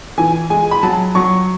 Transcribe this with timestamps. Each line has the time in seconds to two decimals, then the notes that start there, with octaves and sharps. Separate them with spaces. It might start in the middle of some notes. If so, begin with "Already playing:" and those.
0.18 E3 G#5
0.50 G#3 G#5
0.71 B5
0.83 F#3 A5
1.15 F#3 C#6